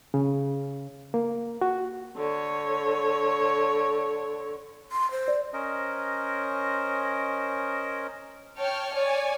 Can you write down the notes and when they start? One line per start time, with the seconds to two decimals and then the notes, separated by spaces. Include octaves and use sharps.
0.14 C#3
1.14 A#3
1.61 F#4
2.16 D3 C#5
4.92 C6
5.11 C5
5.28 D5
5.53 C#4 A#4 C5 D#5
8.56 C#5 G5 A5 F6
8.95 C#5 D5 G#5